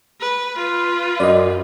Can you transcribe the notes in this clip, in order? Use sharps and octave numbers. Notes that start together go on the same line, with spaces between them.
B4
F4 B4
F#2 D5 D#5